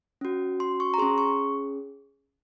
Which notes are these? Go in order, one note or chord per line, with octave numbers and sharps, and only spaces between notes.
C#4 F#4
C6
C#6
A#5
C#4 G#4 C6
C#6